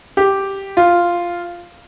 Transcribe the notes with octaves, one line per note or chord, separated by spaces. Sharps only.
G4
F4